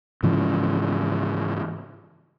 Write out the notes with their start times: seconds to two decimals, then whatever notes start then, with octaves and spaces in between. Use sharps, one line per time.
0.23 G#2 C#3 E3 F3